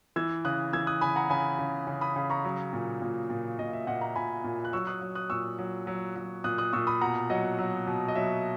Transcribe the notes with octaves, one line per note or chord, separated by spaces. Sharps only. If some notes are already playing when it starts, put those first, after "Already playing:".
E3 E6 G#6
C#3 D#6 F#6
E3 E6 G#6
D#6 F#6
C#3 G#5 B5
F#5 A#5
C#3 G#5 B5
C#3
C#3
B5 D#6
C#3
A#5 C#6
F#3
A#2
A#2
A#2
A#2 D#5
E5
A#2 D#5 F#5
F#5 A#5
A#2 G#5 B5
A#2
F#6
F#3 C#6 E6
D#6 F#6
F#3
D#6 F#6
A#2 C#6 E6
F#3
F#3
F#3
A#2 D#6 F#6
D#6 F#6
A#2 C#6 E6
B5 D#6
B2 F#5 A#5
F#3 D#5 F#5
F#3
B2
D#5
F#3 E5